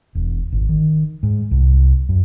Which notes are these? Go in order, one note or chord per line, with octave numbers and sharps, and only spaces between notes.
E1
G#1
D#3
G#2
C2
F#2